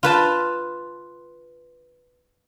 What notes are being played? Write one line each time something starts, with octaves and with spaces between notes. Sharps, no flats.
F4 B4 A5